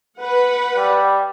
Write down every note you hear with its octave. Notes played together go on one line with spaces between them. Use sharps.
B4 F#5
G3